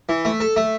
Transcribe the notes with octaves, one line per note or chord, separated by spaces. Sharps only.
E3
A3
A4
A3